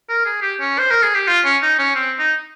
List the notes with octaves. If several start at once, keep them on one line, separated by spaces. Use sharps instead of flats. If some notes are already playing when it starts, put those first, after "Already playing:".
A#4
G#4
G4
C#4
C5
A#4
G#4
G4
F4
C#4
D#4
C#4
C4
D#4